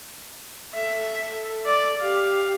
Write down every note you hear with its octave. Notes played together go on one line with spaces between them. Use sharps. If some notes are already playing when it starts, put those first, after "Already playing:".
A4 E5
D5
G4 F5